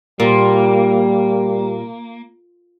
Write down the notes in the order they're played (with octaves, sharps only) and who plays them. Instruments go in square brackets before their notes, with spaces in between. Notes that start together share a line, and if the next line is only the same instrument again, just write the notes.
[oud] A#2 [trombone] G3 [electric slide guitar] A#3